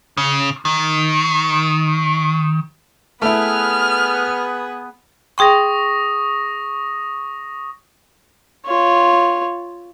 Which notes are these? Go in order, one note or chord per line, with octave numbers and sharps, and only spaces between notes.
C#3
D#3
A3 B3 E4 G#4 B4 F6
G#4 G5 C6 C#6 D#6 A#6
F4 C#5